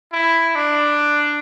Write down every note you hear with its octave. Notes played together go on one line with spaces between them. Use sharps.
E4
D4